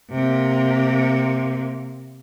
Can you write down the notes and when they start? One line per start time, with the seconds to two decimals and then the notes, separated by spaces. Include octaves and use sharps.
0.11 C3 A#3